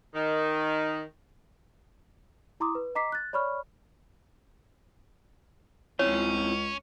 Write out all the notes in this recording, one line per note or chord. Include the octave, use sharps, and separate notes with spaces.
D#3
E4 A#5 C6 D6 D#6
B4
D#5 A#5 D6 B6 C7
F#6 A6
C#5 D5 B5 C#6 F6
C#2 C4 C#4 E4 F4 C#5